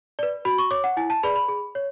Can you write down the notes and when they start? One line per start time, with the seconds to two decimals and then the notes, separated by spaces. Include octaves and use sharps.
0.19 B4 D5
0.45 F#4 B5
0.58 C#6
0.71 C#5 D6
0.84 F#5
0.97 E4 G#5
1.10 A5
1.23 G#4 B4 D5 B5
1.36 B5
1.48 G#4
1.75 C#5